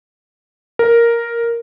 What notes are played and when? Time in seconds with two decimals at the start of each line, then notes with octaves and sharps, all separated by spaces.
0.79 A#4